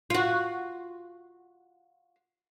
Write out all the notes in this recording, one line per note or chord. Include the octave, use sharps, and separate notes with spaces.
F4 F#4